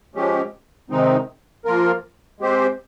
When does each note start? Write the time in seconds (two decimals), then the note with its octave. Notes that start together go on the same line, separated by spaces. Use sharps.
0.15 F3 G#3 C#4 G4
0.90 C3 D#3 G#3 C4 D#4
1.65 F3 A#3 F4 A#4
2.40 G#3 C4 G4 C5